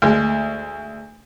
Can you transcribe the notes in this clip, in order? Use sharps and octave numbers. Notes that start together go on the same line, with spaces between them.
D2 G#3